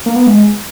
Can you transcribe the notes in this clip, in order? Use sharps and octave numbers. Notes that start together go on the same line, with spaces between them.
A#3
B3
G#3